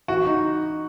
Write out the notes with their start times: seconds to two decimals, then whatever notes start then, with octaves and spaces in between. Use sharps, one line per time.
0.08 E3 F#4
0.26 D#4